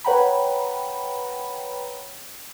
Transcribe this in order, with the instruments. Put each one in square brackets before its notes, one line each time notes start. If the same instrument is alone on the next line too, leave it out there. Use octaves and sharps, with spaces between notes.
[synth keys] B4 C#5 F#5 G5 A#5 B5